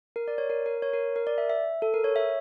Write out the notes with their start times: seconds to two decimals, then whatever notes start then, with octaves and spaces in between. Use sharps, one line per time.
0.16 A#4
0.28 D5
0.38 C#5
0.50 A#4
0.66 A#4
0.82 C#5
0.93 A#4
1.16 A#4
1.27 D5
1.38 E5
1.50 E5
1.82 A4
1.94 A#4
2.04 C#5
2.16 E5